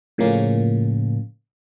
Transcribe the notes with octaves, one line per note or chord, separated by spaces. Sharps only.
A2 C#3 F3 A#3 C#4